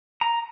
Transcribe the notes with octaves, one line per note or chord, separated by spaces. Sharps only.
A#5